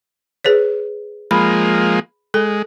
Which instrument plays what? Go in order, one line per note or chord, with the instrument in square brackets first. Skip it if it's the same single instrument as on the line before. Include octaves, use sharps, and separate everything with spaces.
[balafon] G#4 B4 C#5
[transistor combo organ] F3 G#3 A#3 [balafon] B5
[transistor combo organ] G#3 [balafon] A4